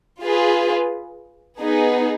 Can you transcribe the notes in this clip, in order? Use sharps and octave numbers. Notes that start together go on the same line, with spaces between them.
F4 G#4 B4
B3 D#4 G#4